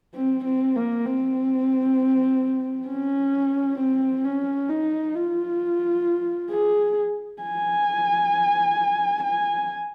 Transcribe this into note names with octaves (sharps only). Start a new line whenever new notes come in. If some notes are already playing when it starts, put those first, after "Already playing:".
C4
C4
A#3
C4
C#4
C4
C#4
D#4
F4
G#4
G#5
G#5